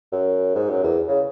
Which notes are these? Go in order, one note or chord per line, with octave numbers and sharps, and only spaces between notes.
F#2
G#2
F#2
E2
C#3